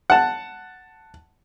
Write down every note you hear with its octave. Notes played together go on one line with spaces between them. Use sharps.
F#5 A5